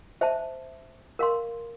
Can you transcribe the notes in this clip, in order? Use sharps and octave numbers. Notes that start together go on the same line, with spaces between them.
C5 E5 A5
A#4 F5 C6